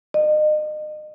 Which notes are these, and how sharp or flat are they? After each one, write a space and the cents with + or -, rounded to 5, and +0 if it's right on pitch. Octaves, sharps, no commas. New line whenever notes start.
D#5 -35